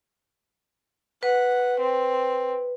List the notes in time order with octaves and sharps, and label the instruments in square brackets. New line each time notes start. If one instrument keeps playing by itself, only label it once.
[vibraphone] B4 [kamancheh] F#5
[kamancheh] C4